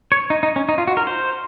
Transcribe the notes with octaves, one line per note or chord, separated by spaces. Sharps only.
C#5
D#4
D#4
C#4
D#4
F4
F#4
A#4
C5